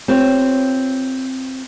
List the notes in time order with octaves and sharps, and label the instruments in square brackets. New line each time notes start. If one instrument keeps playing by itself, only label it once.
[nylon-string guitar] C4 F4 G4 B4 C#5